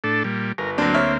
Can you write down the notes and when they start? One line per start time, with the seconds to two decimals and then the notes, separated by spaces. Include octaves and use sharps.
0.04 A2 D4 A4
0.24 A#2 G3
0.58 G1 A#4
0.78 D2 F#3 A#3 C4 D4
0.94 C#5 E5 F6